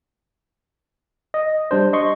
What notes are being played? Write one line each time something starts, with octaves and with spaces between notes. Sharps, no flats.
D#5
G3 D4 C5
D#5 C6 C#6